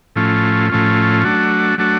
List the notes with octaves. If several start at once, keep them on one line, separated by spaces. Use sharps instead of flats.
A2 F3 A3 C#4 F4
A2 F3 A3 C#4 F4
F#3 A3 D4 F#4
F#3 A3 D4 F#4